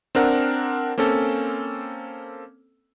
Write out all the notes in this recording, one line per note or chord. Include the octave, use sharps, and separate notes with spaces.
C4 D4 A#4 F#5
A#3 C4 C#4 A4